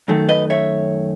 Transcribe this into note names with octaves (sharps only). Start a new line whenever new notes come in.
F#2 D#3 A3
B4 D#5
C#5 E5